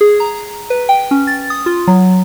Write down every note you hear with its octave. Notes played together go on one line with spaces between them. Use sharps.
G#4
A#5
B4
G5
C#4
A6
D#6
F4
F#3